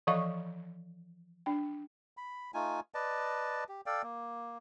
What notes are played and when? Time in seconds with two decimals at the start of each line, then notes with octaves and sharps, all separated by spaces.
0.07 E3 F3 A4 D#5 F5 C#6
1.46 D4 G5
2.17 B5
2.54 A3 D#4 F4 G#5
2.94 B4 D5 D#5 A5
3.69 G4
3.86 A4 D5 F5 G5
4.03 A#3